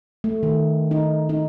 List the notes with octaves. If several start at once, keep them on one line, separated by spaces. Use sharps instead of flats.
A3
D#3
D#4
D#4